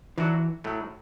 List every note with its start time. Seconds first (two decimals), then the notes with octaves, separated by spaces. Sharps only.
0.18 E3 F#3 D4 F#4 A4
0.64 A2 F#3 A3